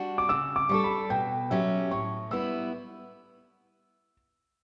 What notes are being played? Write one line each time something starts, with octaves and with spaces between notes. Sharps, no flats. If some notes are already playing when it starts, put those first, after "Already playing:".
Already playing: G3 D4 F#4
D6
C#3 E6
D6
G3 D4 A4 C#6
B5
B2 G5
F#3 C#4 G4 E5
A2 C#6
G3 B3 E4 E6